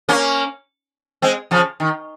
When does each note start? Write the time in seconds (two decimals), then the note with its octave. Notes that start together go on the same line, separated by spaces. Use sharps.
0.09 A#3 C#4
1.22 G#3 C4
1.51 C#3 F3
1.80 D#3